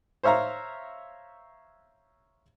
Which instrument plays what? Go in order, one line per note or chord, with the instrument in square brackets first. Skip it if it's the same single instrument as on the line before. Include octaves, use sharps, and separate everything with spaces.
[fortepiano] C5 C#5 E5 F5 A#5